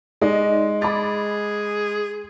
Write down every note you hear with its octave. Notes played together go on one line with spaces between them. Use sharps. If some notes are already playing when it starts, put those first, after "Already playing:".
G#3 D#4 D5 D#5
G#4 B5 D6 A6